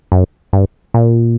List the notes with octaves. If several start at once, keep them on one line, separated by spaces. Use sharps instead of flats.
F#2
G2
A#2